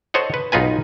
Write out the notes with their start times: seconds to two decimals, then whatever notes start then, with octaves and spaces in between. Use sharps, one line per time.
0.14 A4 C5 C#5 D#5 F#5
0.34 B4
0.52 B1 D#4 F4 B4 G#5